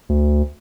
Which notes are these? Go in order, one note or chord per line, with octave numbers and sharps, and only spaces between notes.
D2